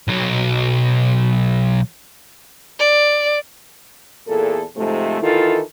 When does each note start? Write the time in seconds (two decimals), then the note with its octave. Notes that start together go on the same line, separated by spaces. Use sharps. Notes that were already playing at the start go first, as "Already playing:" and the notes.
0.08 B1 F#3
2.80 D5
4.27 E2 A#2 G#4 A4
4.76 G#2 C3 F3 A3
5.22 D#3 E3 E4 F4 A4